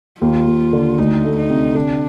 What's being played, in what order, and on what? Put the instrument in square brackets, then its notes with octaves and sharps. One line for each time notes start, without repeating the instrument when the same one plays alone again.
[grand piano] D#2 [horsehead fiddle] F4
[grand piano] D#2
D3
[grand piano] D2 [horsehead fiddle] D#4
[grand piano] A3
[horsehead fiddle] D#4
[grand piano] C3
[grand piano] D3 [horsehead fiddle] D4